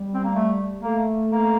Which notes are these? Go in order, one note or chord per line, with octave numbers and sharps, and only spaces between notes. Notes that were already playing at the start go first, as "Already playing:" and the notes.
Already playing: G3
C4
A#3
A3
A3 A#3
A#3